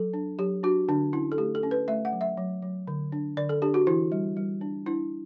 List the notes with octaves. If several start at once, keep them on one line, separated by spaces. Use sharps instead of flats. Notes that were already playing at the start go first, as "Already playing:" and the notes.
Already playing: F#3 A4
D4
F#3 G4
D4 F#4
D3 D4
C#4 E4
A4
A3 G4
A4
C#4
B4
A3 E5
F#5
F#3
E5
F#3
F#3
D3
D4
D3 D5
A4
D4 G4
F#4
E3 E4
G3
G3
D4
D4 E4